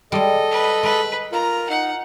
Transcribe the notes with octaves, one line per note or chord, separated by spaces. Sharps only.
G3 G#3 A4 D#5
B4
G#3 B4
F4 A#4 A#5
D#4 F#5